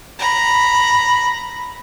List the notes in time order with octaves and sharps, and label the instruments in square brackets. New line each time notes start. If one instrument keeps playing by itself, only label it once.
[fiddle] A#5 B5